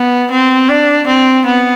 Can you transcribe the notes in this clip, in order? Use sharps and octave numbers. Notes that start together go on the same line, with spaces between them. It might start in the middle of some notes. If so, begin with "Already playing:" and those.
Already playing: B3
C4
D4
C4
B3